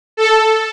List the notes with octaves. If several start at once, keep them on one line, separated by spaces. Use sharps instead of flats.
A4